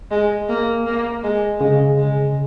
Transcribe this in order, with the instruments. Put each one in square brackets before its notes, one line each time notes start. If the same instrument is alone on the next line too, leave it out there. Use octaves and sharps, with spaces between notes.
[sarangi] G#3
A#3
A#3
G#3
[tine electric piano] C#3 [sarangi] G#3
[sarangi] G#3